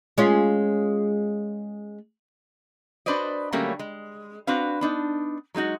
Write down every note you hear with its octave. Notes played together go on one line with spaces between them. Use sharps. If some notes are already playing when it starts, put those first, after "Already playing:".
G#3 C#4 F4
D4 F#4 B4 C5 D5 D#5
D3 F#3 G3 A3 A#3 C#4
G#3
C4 D4 F#4 B4 F5
B3 D4 D#4
F#3 G#3 D#4 F#4